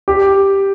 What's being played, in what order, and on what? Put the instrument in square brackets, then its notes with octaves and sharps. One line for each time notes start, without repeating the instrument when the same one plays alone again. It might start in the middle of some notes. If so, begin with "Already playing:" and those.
[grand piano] G4